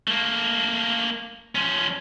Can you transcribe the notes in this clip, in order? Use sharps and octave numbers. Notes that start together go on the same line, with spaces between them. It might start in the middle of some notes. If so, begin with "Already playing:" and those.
A3 A#3
F3 C#4